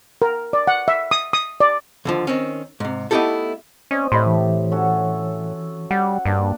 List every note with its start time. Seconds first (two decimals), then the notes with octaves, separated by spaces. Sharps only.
0.22 A#4
0.53 D5
0.67 F#5
0.88 E5
1.11 D#6
1.33 D#6
1.60 D5
2.05 D#2 D3 F3
2.27 D#3 C4 C#4
2.80 G#2 C3
3.11 A3 B3 D#4 E4 G4 A4
3.91 C4 C#4 D5 D#5
4.12 A2 G4 D#5 E5 B5 C6
4.26 E3
4.71 C#4 F#4 A4
5.91 G3 F#5
6.25 G2 A#3 D4